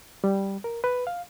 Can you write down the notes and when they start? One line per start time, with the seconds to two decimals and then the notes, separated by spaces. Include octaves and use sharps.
0.24 G3
0.64 A#4
0.84 B4
1.07 F5